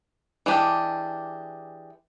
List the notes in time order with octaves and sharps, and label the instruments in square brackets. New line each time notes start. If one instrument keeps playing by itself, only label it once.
[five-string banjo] E3 G#3 D4 G4